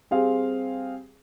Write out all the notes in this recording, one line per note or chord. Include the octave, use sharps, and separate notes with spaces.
G3 C4 G#4 F5